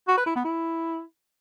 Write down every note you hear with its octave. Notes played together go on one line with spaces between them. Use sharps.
F#4
B4
E4
B3
E4